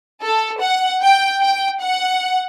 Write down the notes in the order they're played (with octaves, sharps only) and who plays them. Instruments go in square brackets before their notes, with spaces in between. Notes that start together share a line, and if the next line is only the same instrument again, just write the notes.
[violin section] A4
F#5
G5
G5
F#5